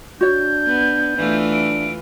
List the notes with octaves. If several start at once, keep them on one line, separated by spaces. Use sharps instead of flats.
D4 F#4 C#5 G6
B3
E3 A3 D4 F4
D7